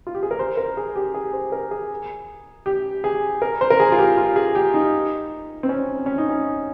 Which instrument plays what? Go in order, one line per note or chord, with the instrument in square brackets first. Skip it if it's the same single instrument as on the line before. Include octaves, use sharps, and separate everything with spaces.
[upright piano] F4
G4
G#4
A#4
C5
A#4
G#4
G4
G#4
C5
A#4
G#4
G4
G#4
A#4
C5
A#4
G#4
F4
G4
F4
G#4
G4
D#4
C4
C#4
C#4
D#4
C#4